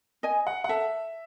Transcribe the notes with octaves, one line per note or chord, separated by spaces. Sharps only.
D#5 G#5
F#5
F#5
A4 E5